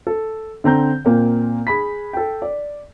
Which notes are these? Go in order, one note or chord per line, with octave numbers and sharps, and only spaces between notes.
A4
D3 C4 A#5 G6
A#2 A#3 C4
G#4 B5 B6
A4 G5
D5